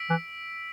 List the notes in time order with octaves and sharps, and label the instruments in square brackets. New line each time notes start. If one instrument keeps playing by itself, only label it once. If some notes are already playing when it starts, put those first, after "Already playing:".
Already playing: [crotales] E6 B6 D7
[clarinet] E3